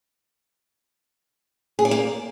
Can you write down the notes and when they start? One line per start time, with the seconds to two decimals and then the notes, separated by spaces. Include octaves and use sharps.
1.79 G#4
1.85 D5
1.91 A#3